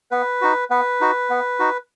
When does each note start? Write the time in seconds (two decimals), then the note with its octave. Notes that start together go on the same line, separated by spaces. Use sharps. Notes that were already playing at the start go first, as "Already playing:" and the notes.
0.11 B3 B4
0.41 D#4 F#4
0.70 B3 B4
1.01 D#4 F#4
1.30 B3
1.59 D#4 F#4